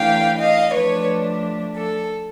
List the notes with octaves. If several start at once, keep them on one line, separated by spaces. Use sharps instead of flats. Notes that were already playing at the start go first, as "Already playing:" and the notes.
Already playing: E3 A3 D4 F5 G5
D#5 F5
F3 A3 D4 B4 C#5
A4